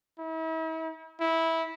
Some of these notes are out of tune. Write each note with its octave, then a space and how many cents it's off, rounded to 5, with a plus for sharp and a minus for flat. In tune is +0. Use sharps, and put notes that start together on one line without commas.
E4 -40
E4 -15